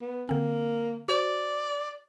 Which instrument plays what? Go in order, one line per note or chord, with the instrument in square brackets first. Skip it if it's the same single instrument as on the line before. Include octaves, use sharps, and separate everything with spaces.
[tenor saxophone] B3
[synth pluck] D3 C4 [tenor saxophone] A#3
[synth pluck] F#4 C5 [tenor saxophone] D5